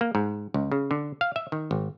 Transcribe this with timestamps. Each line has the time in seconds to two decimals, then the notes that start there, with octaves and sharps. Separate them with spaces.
0.01 A#3
0.15 G#2
0.54 C#2
0.72 C#3
0.91 D3
1.21 F5
1.36 E5
1.52 D#3
1.71 G#1